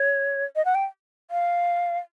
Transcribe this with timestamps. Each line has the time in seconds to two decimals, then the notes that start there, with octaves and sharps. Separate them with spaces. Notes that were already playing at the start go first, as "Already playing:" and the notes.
Already playing: C#5
0.56 D#5
0.65 F#5
0.75 G5
1.31 F5